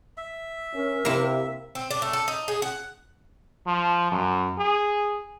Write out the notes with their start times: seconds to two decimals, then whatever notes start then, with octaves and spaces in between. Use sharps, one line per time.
0.17 E5
0.74 C#4 A#4
1.05 C3 A#3 E4
1.75 C4
1.91 D4
2.02 A3
2.13 A4
2.28 D#4
2.48 G#4
2.62 F#5
3.66 F3
4.12 F#2
4.58 G#4